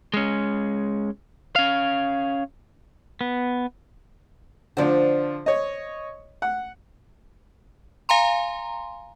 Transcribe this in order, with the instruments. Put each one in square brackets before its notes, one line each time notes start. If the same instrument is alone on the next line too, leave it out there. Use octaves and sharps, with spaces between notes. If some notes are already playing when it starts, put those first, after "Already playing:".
[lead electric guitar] G#3 C#4
C#4 F5
[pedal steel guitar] B3
[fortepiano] D3 F3 D4 [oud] C5 D5
[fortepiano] C#5 D#5
F#5
[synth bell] F5 G#5 A#5 C6